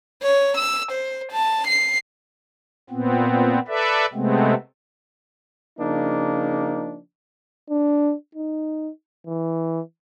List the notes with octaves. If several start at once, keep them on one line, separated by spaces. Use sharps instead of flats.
C#5
E6
C5
A5
C7
A#2 B3 C4
A4 B4 D5 E5
C3 G#3 A3 B3 C4
C#3 F3 A#3 D4 D#4
D4
D#4
E3